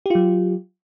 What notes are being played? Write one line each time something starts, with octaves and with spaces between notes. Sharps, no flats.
F#3 F4 G4